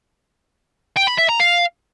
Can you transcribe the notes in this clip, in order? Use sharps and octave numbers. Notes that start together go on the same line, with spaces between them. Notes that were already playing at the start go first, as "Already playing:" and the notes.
G5
B5
E5
A#5
F5